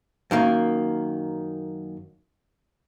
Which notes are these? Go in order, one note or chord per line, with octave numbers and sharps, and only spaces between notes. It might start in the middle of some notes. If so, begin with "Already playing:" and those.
F#2 D#3 A#3